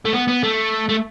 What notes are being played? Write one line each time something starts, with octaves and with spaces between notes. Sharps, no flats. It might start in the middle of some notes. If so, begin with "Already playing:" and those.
A3
B3
B3
A3
A3